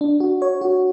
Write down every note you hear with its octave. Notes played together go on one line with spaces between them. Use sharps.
D4
F#4
C#5
F#4